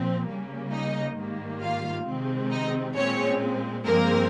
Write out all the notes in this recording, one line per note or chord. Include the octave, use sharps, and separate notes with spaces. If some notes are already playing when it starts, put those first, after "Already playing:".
Already playing: A#2 F3 C4
C#3 G3 A#3
D#4 D#5
G#2 D#3 G3 A#3
F4 F5
C3 D#3 G#3 C4
D#4 D#5
A#2 G#3 C4 C#4 C#5
G2 F3 G#3 A#3 C4 A#4